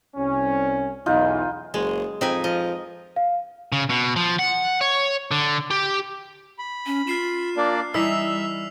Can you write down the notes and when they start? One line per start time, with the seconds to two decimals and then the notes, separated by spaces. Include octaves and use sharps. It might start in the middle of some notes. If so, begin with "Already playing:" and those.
0.16 C2 C#4
1.06 B1 E2 D#4 F4
1.74 F#1 G#3 G#4
2.21 F2 C4 D#4 B4 G#5
2.44 F3 D#5
3.16 F5
3.72 C#3
3.90 B2
4.16 F3
4.39 F#5
4.81 C#5
5.31 D3
5.71 G4
6.59 B5
6.86 C#4
7.07 F4 F6 C7 E7
7.57 A#3 D4 D5
7.94 E3 G3 D#4 E4 E5 E6 B6 F7